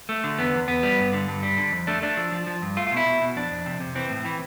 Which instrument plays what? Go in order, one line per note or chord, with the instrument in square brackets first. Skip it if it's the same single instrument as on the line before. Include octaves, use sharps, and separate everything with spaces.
[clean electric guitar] A3
D3
E2 B3
E2
E2 B3
G3
G2
D3
G2
G3
D3
F2
A3 D4
A3 D4
F3
F3
F3
G2
A3 F4
F4
B2 E4
B2
B2
F2 D4
F2
C3
C3
E3 C4
A2
E3